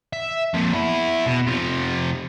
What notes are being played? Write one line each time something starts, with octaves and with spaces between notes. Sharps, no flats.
E5
F2 A#2
B3 E4
B2
C3 F3